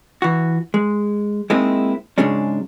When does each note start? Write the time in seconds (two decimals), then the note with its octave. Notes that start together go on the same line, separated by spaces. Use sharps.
0.22 E3 F#4
0.74 G#3
1.50 G#3 A#3 C4 D#4 E4
2.18 G#2 C#3 F#3 G#3 C#4 D4